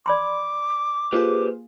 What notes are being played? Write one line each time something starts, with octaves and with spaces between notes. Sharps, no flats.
D5 B5 C6 D6
A#3 F4 G4 G#4 B4 C5